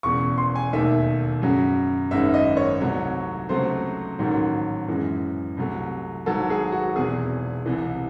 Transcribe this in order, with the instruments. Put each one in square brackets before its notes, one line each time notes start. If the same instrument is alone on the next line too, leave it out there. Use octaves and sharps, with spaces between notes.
[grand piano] E1 E2 C#3 C#6
C6
G#5
E1 D#2 D#3 A3 E5
F#2 C#3 F#3
G#1 F#2 D#3 G#3 E5
D#5
C#5
C2 C3 F#3 A3
C#2 C3 F#3 A3 C5
A1 G#2 D#3 F#3
F#2 E3 G#3
C2 C3 F#3 A3
G#1 G#2 F#3 A4
G#4
F#4
E1 E2 C3 G#4
C2 C3 E3